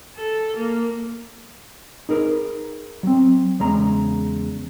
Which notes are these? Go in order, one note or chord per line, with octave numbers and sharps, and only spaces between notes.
A4
A#3
D#4 G#4 A#4 B4
F#3 C4
E2 C#3 G#3 A#5